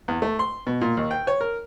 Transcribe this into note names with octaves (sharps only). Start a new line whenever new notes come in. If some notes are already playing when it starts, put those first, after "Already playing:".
E2
A3
C6
B2
A#2
D#2
G5
C#5
A#4